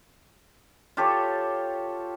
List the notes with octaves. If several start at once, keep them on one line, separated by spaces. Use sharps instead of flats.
F4 G4 A4 C#5